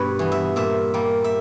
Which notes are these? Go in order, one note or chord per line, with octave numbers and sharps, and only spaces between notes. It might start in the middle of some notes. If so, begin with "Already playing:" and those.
Already playing: G2 B2 B4 C#5
E3 B3
E5
A#2 E5
G3 A#3
E5